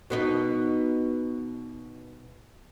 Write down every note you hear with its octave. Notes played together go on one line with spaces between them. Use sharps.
B2 B3 D#4